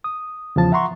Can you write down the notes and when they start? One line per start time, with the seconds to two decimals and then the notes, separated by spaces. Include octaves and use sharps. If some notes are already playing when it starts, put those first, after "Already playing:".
0.04 D#6
0.56 E2 C#3 F3 A5
0.72 E5 F#5 A#5 C6 C#6